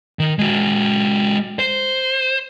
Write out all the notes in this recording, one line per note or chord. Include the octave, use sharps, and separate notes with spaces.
D#3
G#3 F#4
C5